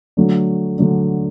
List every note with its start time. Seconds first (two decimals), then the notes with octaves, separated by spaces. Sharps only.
0.17 D3 F#3 A3 D4
0.79 D3 F#3 A3 D4